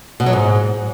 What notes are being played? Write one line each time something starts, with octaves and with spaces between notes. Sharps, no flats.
B2
F#3
G#2